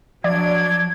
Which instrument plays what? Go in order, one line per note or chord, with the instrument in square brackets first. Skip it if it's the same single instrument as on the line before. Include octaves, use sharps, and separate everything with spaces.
[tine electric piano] F3 [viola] F#3 D4 [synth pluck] D5 [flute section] G#6